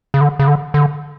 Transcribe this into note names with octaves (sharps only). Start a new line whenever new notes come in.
C#3
D3
C#3
D3
D3